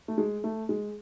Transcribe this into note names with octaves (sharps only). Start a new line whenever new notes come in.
A3
G#3
A3
G#3